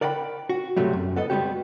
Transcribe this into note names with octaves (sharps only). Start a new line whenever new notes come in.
A#4 D5 F#5 G5 A#5 B5
F#4
D2 G#2 C3 F#3 G3 A3
F#2
B3 A4 D#5
G3 G#3 B3 F#4 G4